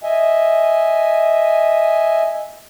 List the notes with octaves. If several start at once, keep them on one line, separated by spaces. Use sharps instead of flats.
D#5 E5 G#5